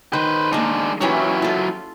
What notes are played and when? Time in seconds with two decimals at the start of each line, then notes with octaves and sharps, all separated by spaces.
0.13 D#3 B4 C5
0.53 G#3 A#3 D4 A#4
1.01 E3 F#3 C#4 E4 G4
1.42 F4 A4